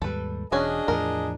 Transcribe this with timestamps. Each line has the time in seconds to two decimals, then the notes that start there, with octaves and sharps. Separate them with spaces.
0.02 D#2 G#2 G3 A4 B4
0.52 E1 C#4 D4 F#4 G#4 D#5
0.88 E2 A2 F3 A#4